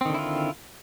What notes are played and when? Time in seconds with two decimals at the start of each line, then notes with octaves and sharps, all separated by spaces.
0.01 C4
0.05 D#3
0.10 D3
0.14 E4
0.19 F4